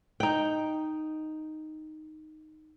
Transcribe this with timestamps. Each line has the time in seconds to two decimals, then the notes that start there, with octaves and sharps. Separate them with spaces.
0.20 D#4 G5